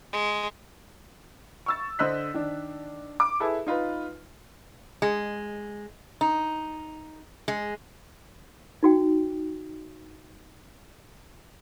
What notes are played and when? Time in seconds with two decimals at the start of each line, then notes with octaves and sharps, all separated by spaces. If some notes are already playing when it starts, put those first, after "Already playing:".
0.12 G#3
1.66 C#6 E6 A6
1.99 D3 C5 D#5 E6 F#6 B6
2.34 D#3 D4
3.20 D6
3.40 E4 G#4 A4 B4
3.67 D#4 F4 B4
5.02 G#3
6.21 D#4
7.48 G#3
8.83 D#4 F#4 G5